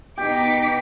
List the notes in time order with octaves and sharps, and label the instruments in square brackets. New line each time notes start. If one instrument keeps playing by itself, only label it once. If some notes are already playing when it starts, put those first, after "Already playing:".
[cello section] B2 B3 D#4 [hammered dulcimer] G4 [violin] D6 B6